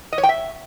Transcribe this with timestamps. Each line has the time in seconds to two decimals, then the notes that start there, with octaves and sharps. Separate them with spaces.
0.12 D#5
0.18 C#5
0.23 G5
0.29 E5